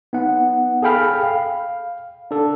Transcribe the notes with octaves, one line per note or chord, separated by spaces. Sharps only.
B3 D#4 F#5
G#4 A4 F5 G5 B5 F6
F5
D4 A4